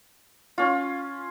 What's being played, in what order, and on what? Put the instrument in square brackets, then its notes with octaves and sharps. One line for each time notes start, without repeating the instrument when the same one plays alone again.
[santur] C#4 F4